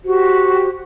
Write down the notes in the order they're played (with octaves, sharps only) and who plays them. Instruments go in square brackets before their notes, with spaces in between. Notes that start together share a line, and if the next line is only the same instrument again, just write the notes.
[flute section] F#4 G4 C5